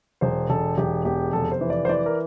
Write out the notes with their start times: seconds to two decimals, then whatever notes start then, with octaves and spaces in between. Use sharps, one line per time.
0.21 E1 C5
0.50 E1 A4
0.78 E1 G4
1.05 E2 G4
1.33 F1 A4
1.51 C5
1.61 E3
1.70 D5
1.85 C5
1.89 E3 D5
2.06 A#4